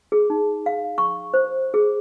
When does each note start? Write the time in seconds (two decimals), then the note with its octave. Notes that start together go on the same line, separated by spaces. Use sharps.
0.12 G#4
0.30 D#4
0.66 F5
0.98 C#6
1.34 C5
1.74 G#4